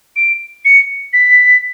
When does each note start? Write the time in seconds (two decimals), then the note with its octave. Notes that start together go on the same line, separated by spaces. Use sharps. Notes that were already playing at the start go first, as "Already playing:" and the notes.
0.16 D7
0.65 C#7
1.13 B6